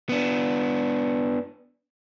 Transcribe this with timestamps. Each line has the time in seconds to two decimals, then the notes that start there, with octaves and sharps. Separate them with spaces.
0.09 B3 D4